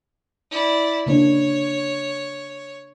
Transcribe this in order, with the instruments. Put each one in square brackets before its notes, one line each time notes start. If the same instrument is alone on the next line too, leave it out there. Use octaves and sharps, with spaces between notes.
[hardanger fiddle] E4 D5
[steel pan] C#3 A#3 D4 [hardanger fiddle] C#5